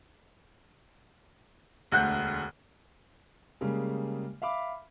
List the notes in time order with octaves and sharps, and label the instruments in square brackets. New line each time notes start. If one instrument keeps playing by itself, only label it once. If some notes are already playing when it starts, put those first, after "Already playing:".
[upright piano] E1 D2 F#5 F#6 G6
[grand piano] C#3 G3 G#3 A#3
E5 F5 B5 D6